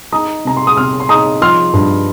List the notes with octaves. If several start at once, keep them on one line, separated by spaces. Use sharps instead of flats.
D#4 A#5 D#6
C3 A#5
C6
D#6
C3 C6 F6
C6
D#4 A#5 D#6
F3 C6 F6
G2